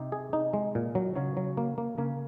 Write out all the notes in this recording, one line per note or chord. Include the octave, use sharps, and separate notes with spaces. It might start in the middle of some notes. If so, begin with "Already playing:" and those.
Already playing: C3 D#4
G#4
D#4
G#3
A#2
F#3
C#3 F#3
F#3
A#3
A#3
C#3 A#3